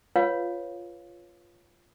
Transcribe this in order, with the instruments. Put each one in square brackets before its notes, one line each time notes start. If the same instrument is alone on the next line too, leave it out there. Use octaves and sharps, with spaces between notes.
[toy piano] F4 B4 C#5 F5